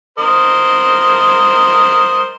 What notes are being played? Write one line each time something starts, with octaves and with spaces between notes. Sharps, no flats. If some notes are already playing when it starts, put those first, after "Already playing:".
A#4 C5 D#5